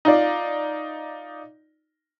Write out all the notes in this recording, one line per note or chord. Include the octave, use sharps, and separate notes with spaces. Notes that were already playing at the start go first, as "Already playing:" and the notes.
D#4 F4 D5